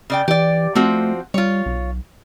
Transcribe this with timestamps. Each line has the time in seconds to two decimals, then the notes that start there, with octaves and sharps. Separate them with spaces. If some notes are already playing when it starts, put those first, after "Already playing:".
0.10 C#3 D5 G5
0.28 E3 G4 D5
0.75 F3 A3 C4 F#4
1.34 G3 F4 C#5
1.66 B1